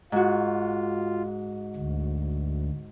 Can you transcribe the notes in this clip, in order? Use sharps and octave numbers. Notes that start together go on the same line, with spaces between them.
G#2 F4 F#4
D2